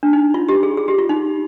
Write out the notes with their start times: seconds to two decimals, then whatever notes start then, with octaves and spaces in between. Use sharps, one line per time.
0.03 D4
0.13 D#4
0.34 F4
0.49 G4
0.63 G#4
0.77 G#4
0.88 G4
0.98 F4
1.09 D#4